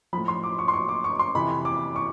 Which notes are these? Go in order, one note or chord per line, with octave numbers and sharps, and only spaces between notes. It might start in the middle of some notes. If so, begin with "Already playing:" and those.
A2 F3 B5
C6
D6
C#6
C6
C#6
D6
C#6
C6
F2 C3 E3 B5
D6
C#6